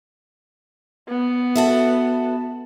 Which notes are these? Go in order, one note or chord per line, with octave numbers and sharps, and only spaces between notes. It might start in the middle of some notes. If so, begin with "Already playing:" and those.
B3
F#4 A4 E5